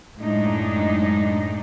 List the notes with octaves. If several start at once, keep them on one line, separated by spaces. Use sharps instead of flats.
F#2 A2 G#3 D4 D#4